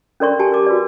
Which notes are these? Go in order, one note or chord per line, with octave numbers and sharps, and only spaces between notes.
C#4 A4 A#4 D5 C6 C#6
G4 G#5 A5
A#4 D6
F#4 B4 D5